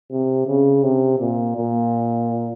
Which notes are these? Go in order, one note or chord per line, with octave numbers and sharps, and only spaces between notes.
C3
C#3
C3
A#2
A#2